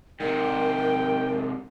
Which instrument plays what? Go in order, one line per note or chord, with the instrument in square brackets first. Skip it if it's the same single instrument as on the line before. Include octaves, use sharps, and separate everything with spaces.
[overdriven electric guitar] G#2 C3 [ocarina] A#4 [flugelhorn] G5